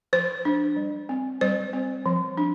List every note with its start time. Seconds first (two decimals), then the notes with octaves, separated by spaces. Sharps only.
0.13 F3 C5
0.45 D4
0.76 G3
1.09 C4
1.41 G3 C5
1.73 C4
2.06 F3
2.37 D4